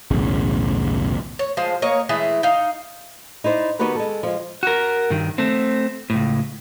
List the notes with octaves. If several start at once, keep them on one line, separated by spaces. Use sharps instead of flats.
B1 E2 A2 C#3
C#5
F3 G#3 C5
A#3 C#5 D#5
E3 G#3 A3 E4
D#4 F5
D#4 E4 C5 D5
D#3 B3 D#4 F#4 G4 B4
G#3 A4
F3 G#3
F#4 A#4
G2 D#3
A3 C4
C#2 A2